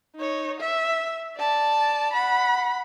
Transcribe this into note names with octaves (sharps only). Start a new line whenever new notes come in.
D#4 C#5
E5
D5 A5
F#5 B5